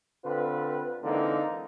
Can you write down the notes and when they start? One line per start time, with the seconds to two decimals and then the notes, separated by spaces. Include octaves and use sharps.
0.25 D3 C4 F4 B4
1.03 D3 E3 G#3 A#3 C4 D#4